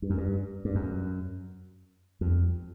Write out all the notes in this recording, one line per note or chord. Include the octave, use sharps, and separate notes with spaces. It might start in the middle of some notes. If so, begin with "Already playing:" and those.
G2
F#2
G2
G2
F#2
F2